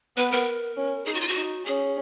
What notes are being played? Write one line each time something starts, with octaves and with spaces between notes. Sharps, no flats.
B3 B4
A#4
C#4
D#4 G#4
F#4
F4
F#4
D#4
C#4 G#4